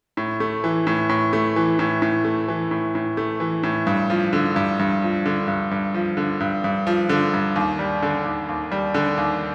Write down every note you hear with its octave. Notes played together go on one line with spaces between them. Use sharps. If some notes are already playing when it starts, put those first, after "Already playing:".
A2
A3
E3
A2
A2
A3
E3
A2
A2
A3
E3
A2
A2
A3
E3
A2
G2
F3
D3
G2
G2
F3
D3
G2
G2
F3
D3
G2
G2
F3
D3
G2
D#2
G3
D3
D#2
D#2
G3
D3
D#2